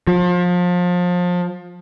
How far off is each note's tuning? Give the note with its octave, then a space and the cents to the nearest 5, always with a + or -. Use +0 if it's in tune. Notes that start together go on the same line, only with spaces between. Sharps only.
F3 +30